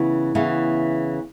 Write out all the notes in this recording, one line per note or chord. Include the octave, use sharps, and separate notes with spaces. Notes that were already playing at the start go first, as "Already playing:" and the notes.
Already playing: C#3 E3 B3
C#3 E3 B3